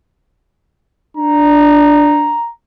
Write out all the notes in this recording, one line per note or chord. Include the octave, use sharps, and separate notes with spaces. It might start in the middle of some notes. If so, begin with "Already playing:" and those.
D4 A#5